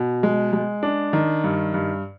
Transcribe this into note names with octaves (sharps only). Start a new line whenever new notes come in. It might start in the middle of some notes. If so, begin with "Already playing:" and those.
Already playing: B2
G#3
G#3
D4
D#3
G2
G2